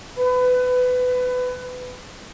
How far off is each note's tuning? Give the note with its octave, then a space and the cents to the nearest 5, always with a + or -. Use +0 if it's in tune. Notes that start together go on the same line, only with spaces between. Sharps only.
B4 +20